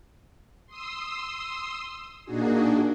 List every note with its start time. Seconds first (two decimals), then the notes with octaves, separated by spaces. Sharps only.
0.67 C6 D#6 E6
2.25 A#2 A#3 D4 D#4 F#4 G#4